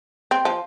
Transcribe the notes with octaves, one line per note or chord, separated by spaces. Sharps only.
C4
F3